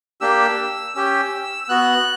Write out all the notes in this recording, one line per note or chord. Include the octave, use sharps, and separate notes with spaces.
A#3 D4 G4 E6
C#4 G4 E6
E6
B3 F#4 F#6